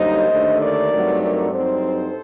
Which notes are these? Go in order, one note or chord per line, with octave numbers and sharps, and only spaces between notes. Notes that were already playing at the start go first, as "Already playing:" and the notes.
Already playing: F#2 D3 G3 A#3 D#4 C5 D#5
D#2 D3 A3 D4
A#4 D5
G2 F#3 A3 C4 D#4
A#4 D5
G2 F#3 C4 D#4 A4 C5